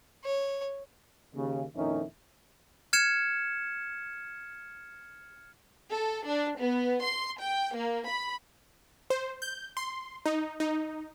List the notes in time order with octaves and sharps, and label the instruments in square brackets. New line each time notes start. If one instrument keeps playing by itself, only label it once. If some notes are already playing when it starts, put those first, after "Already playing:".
[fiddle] C#5
[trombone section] D#2 C#3
F2 A#2 D#3 C#4 D#4 E4
[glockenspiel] F6 G#6 C#7 E7
[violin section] A4
D4
B3
C6
G5
A#3
B5
[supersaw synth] C5
G6
C6
D#4
D#4